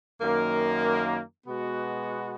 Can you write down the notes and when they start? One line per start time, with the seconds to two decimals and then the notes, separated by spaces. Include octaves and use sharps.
0.21 F#2 D#3 A#3
1.47 B2 G#3 B3 F#4